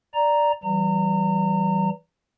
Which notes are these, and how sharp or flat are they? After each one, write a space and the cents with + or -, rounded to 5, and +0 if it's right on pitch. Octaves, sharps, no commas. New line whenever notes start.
D5 +0 A#5 +0
E3 +0 G3 -35 A#5 -30